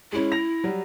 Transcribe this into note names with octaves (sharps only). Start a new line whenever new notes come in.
G#3 C#4 E4
A#6 F7
F#3 G3